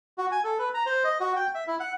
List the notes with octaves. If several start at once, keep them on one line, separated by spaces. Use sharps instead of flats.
F#4
G#5
A4
B4
A#5
C5
D#5
F#4
G5
E5
E4
F#5